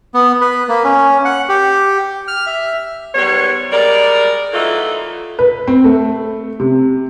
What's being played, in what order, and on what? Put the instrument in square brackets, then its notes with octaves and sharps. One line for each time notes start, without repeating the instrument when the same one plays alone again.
[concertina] B3
B4
A#3
C#4
F#5
G4
F6
E5
[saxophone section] G#2 D#3 F#3 G3 B3 C#5
G3 G#3 A#4 D5
E3 F#3 A3 D#4 F4 A4
[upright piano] B4
C4
A3
C3